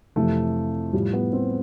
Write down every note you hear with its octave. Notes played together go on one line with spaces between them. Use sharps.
F2 C3 E3 A3
A2 F3 G3
B3
C4